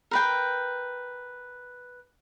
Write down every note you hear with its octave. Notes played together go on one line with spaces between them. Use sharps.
A#4 B4 G5